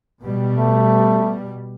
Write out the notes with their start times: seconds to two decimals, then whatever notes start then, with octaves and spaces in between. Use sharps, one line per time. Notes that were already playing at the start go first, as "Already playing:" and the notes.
0.23 B2 G3
0.58 A3